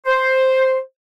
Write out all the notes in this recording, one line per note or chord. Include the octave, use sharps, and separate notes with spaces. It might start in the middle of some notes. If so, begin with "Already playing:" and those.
C5